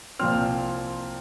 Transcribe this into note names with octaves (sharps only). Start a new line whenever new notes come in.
C2 A#2 F3 C4 F6